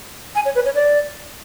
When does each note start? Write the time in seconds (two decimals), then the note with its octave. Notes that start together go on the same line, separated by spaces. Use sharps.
0.35 G#5
0.45 C#5
0.55 B4
0.65 C#5
0.75 D5